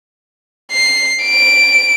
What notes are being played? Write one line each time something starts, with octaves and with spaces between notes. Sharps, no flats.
C7
D7